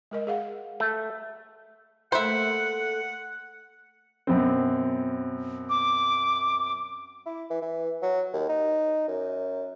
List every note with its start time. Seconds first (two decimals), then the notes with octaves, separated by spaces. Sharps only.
0.11 G#3 A#4 D#5
0.27 G#4 F5 F#5
0.80 A3
2.12 A3 A#3 C5 E5 F#5
4.27 F#2 B2 C4
5.69 D6
7.26 E4
7.50 E3
7.62 E3
8.02 F#3
8.33 D#2
8.49 D#4
9.08 F#2